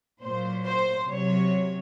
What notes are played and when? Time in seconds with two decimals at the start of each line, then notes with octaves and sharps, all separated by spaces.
0.22 A#2 F#3 C5
0.65 C5
1.09 C3 F#3 C#5